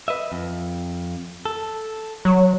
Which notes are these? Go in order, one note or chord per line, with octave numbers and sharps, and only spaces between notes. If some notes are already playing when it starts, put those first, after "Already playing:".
B4 D#5 E5
F2
A4
F#3